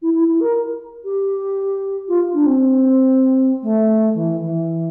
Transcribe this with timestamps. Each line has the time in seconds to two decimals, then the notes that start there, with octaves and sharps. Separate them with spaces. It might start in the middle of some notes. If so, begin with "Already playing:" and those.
0.02 E4
0.14 E4
0.28 E4
0.41 A#4
1.05 G4
2.08 F4
2.34 D4
2.46 C4
3.63 A3
4.15 E3
4.41 E3